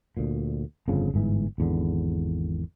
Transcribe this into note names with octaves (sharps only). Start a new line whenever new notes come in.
D2 A#2
G1 F2 C#3 F3
G1 G#2 E3
G#1 E2 D3